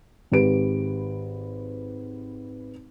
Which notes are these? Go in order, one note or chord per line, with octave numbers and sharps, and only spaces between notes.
G#1 G4 B4 D7